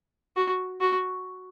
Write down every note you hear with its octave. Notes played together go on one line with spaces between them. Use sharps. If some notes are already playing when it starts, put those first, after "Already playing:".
F#4
F#4